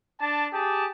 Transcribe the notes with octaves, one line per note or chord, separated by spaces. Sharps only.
D4 A5
G4 G#4 A5